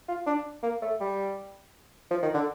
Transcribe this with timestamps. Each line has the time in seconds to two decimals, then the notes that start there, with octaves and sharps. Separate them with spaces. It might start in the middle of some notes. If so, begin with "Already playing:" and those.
0.08 F4
0.26 D4
0.63 A#3
0.82 A3
1.00 G3
2.11 F3
2.23 D#3
2.34 D3